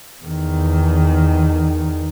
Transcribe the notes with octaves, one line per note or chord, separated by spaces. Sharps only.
E2 D#3